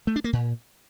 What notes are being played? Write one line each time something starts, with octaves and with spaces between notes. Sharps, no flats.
A3
D4
A#3
A#2